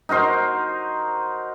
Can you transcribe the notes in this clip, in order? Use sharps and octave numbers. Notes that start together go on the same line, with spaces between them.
D#4 F#4 A#4 C5